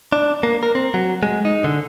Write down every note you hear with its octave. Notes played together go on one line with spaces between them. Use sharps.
D4
A#3
A#4
C4
F#3
G#3
D#4
D3